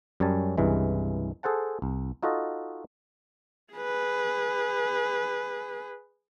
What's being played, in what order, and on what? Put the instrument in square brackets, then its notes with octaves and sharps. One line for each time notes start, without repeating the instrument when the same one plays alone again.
[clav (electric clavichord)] F#2 G3 C#4 G#5 A5
C2 G2 C#3 E3 G#3
G#4 A4 C5 F#5 A5
C2
D#4 F4 F#4 A4 D#5
[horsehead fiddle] G#4 B4